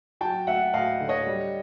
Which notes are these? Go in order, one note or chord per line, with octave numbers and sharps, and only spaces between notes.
F#3 G5 A5
D2 E5 F#5
D2 D#5 F5
D3
C#5 D#5
G3